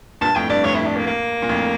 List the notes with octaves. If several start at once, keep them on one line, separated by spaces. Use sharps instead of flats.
G2 A#2 A5
F2 A2 G5
G2 D5
F2 A2 C#5
E4
D4
A#3
A#3
A#2
F2 A2